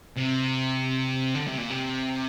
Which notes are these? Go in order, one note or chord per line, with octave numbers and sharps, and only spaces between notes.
C3
D3
C3
A#2
C3